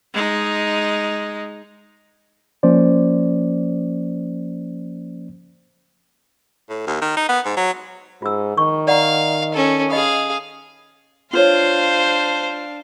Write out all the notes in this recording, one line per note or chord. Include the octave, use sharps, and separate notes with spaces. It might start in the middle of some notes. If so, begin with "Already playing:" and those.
G#3 D#4
F3 A#3 C#4 C5 D5
A2
D#2
D#3
D#4
B3
G#2
F#3
G#2 F4 E6
D#3 C#6
D5 F5 F#5 A#5
C#4 A4
G#4 D#5 F5 B5 D#6
D4 F4 C5 C#5 F5